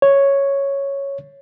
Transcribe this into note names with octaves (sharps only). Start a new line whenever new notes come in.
C#5